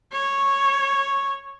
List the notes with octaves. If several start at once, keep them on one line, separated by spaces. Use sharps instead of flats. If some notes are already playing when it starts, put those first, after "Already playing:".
C#5